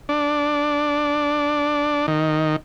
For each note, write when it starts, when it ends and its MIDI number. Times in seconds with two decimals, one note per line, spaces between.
0.09 2.06 62
2.08 2.56 51